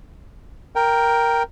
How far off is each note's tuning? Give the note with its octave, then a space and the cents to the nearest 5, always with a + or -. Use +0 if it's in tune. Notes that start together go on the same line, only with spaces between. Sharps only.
A#4 +0 G5 +0